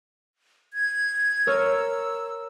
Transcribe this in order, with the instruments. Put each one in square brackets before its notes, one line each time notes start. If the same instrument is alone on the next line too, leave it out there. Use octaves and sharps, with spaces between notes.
[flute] G#6
[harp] A#4 C#5 F6 [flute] E6